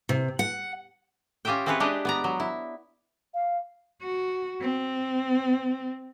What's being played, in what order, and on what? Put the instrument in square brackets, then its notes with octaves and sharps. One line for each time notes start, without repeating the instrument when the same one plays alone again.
[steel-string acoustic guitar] C3
F#5
[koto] C#4 F4 G4 D#5 E5 G5
C4 C#4 E4 G#4 B4 C#5
G#3 D4 G4 B4 D#5 E5
B3 D5 A#5
F#3
E4
[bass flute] F5
[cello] F#4
C4